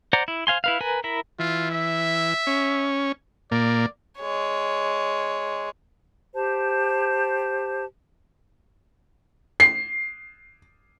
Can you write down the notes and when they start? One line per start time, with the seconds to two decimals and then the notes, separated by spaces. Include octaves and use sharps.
0.13 C5 D5 F#5 A#5
0.28 E4
0.47 C5 F5 G#5 C6
0.64 E4 B4 F5
0.81 A#4 B4 G#5
1.04 E4 A#4 B5
1.39 E3 F4
1.72 E5
2.47 C#4
3.52 A#2 A#3 D5
4.19 G#3 C#5
6.34 G4 C5 A5
9.60 C7